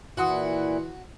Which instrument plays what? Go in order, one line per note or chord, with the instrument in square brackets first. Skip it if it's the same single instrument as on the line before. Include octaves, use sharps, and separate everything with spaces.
[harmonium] A#2 E4 [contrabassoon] E3 [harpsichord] F#4 [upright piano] F#5 C6 D#6